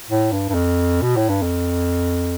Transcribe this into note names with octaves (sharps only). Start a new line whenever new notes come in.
A2
G2
G2
F2
B2
A2
G2
F2